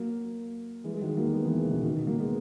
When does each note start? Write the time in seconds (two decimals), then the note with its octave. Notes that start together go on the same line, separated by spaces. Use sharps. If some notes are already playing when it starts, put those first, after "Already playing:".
Already playing: F#3 A#3
0.84 E3 G#3
0.94 G#3
1.01 D#3 F#3
1.17 F#3 A#3
1.33 G#3 B3
1.46 E3 G#3
1.65 C#3
1.70 B2 D#3
1.82 B2 D#3
2.07 F#3 A#3
2.20 G#3 B3